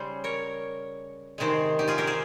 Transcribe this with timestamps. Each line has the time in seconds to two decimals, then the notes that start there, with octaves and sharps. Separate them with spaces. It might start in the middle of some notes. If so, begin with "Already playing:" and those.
Already playing: C#3 G3 G#4 C5
0.24 A#4 C#5
1.38 C3 D#3 G#3 G#4 C5
1.79 D#4 G4
1.88 F4 G#4
1.98 G4 A#4
2.07 G#4 C5